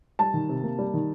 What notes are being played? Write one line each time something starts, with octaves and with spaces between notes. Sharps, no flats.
G3 A5
D#3
C3
A#3
G3
D#3